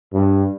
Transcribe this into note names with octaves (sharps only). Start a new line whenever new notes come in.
G2